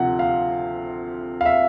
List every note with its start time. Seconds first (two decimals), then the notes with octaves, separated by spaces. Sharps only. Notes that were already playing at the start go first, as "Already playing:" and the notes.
Already playing: D2 C3 F3 F#5
0.19 F5
1.41 F5
1.45 E5